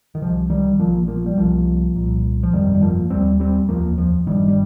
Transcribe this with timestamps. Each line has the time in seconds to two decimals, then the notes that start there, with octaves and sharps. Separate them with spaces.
0.15 D#3
0.21 C2 C3 F3
0.50 D#3 G3
0.79 A#1 A#2 F3 A#3
1.07 F3 A#3
1.26 G3
1.37 C2 C3 F3 A#3
1.95 C2 A#2
2.43 F3
2.53 G1 F2 C3 D#3 G3
2.75 G3
2.81 F3 A#3
3.10 F1 D#2 G3 C4
3.40 G3 C4
3.69 F1 D#2 F3 A#3
3.98 F3
4.26 G1 G2 D#3 G3
4.48 G3